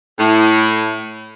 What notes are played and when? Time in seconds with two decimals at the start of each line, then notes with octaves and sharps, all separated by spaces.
0.19 A2